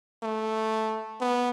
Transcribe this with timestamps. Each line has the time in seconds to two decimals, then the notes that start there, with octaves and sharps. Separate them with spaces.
0.23 A3
1.21 B3